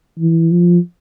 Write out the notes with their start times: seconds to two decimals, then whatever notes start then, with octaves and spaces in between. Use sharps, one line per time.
0.19 E3
0.51 F3